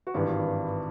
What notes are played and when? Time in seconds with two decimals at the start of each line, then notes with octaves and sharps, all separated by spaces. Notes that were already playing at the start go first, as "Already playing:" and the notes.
0.07 F#4
0.14 G#1 G2 E3 G4